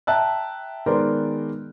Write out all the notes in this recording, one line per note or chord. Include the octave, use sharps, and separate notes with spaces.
E5 G5 A5 A#5 E6 F#6
D#3 G#3 B3 A#4 C5 D5